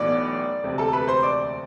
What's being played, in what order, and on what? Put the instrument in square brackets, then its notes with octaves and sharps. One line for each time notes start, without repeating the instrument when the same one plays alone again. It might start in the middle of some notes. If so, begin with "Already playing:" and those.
Already playing: [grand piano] B1 A2 E3 B3 D5 D6
E1 D2 C3
A4 A5
B4 B5
C5 C6
D5 D6